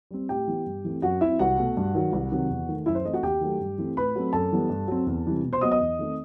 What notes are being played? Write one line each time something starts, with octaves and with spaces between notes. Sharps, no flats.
G3 C4
A2 G4 G5
E3 B3
G2
E3 A3 C4
F#2 F#4 F#5
F#3 C4 E4 E5
C2 F#4 F#5
B2 A3
G2
D#3 F#3
C2
C3 D#3 F#3
E2
D#3 A3
F#2 E4 E5
C5
E3 A3 C4 D#5
F#4 F#5
D#2 G4 G5
D#3 F#3 A3
G2
E3 A3 C4
A2 B4 B5
F#3 A3 C4
F#2 A4 A5
E3 G3 B3
G2
F#3 C4
E2
C3 E3 G3
B2
C5 C6
F#3 B3 D#5 D#6
D#5 D#6
E2
D#3 A3 C4